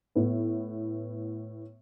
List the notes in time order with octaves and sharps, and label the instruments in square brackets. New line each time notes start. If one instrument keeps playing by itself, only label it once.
[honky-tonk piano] A2 B3